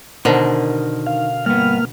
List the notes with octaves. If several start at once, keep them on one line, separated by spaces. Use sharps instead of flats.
B2 D3 D#3 A#4 C5
F5
G2 A#3 B3 F6